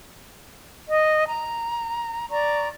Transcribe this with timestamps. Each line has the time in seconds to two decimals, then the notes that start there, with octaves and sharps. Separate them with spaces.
0.89 D#5
1.28 A#5
2.29 D5 A#5 C#6